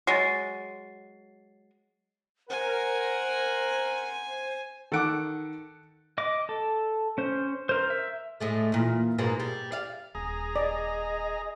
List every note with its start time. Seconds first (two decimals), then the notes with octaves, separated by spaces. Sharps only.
0.07 F#3 G#3 A6 C7
2.50 A#4 C5 F#5 G#5
4.92 D#3 A4 F#5 D6 D7
6.18 D#5 D6
6.49 A4
7.18 C#4 C5
7.69 A#4 C5
7.90 E5
8.40 A2 G#3 A3
8.72 E2 A#2
9.18 G#2 B2 A#3
9.40 G3
9.72 D5 F5
10.15 D#1 G#4 A#5
10.56 D5 D#5